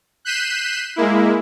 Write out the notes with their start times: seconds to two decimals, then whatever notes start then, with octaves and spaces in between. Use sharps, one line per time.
0.25 F#6 G6 B6 C7 D#7 E7
0.96 G#3 A#3 E4